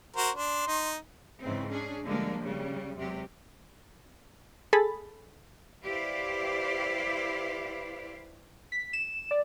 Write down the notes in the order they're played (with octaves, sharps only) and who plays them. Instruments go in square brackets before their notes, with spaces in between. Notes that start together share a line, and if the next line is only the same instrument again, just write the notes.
[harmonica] F#4 A#4 C5
[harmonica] D4 [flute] C6
[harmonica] D#4
[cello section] G#2 C#3 E3 C4
C#4 D4 G#4
D3 F3 G3 G#3 A#3 D4
C#3 G3
E2 C3 F#3 G#3 G4
[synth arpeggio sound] G#4 A4 B5 A6
[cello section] E4 G4 B4 C5 D5 F5
[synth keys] B6
E7
D5